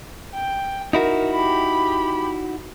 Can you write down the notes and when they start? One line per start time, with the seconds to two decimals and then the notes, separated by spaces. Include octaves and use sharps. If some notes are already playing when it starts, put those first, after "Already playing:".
0.34 G5
0.93 D#4 E4 F#4 A#4
1.34 G4 B5